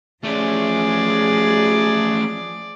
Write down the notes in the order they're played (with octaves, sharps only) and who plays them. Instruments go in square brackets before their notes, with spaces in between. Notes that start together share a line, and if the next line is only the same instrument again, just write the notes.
[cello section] F3 G#4 [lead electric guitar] A3 C#4 [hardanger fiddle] D5